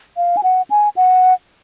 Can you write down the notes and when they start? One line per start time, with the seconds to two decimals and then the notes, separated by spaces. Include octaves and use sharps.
0.17 F5
0.37 G#5
0.43 F#5
0.70 G#5
0.97 F#5